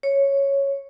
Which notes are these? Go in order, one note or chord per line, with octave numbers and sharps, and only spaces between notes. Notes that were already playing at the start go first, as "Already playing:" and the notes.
C#5